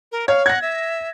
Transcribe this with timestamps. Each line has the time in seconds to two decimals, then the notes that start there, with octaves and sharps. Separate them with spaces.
0.12 A#4
0.28 C#5 F5
0.46 F#5 G#6 A#6
0.62 E5